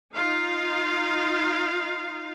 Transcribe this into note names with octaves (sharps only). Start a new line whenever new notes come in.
D#4 F4 F5